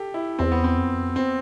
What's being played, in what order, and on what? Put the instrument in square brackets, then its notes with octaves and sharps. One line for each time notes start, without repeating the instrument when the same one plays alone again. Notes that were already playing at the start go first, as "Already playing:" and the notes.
Already playing: [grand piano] G4 A4
E4
[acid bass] E2 [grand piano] C4
[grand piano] B3
C4
[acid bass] F2
[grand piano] C4